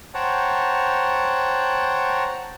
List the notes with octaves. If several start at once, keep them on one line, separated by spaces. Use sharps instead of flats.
C5 C#5 F#5 G5 A5 A#5